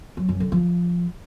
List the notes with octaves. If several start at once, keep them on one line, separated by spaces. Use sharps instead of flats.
F#3
F#2
D3
F3